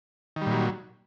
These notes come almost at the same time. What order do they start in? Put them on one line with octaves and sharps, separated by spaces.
D#3 G3 A#2 F#3